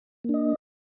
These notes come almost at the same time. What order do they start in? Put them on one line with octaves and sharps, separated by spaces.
A#3 D4 D#5